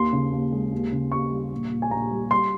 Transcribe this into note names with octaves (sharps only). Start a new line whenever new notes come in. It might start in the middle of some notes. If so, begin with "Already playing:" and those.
Already playing: D#2 C6
C#3
D#2
G#3
D#2
C#3
D#2 C#6
G3
A#1
A#2
G#5
A#1 A#5
G3
G3 C6